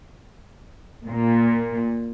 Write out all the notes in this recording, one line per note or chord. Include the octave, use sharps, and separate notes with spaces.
A#2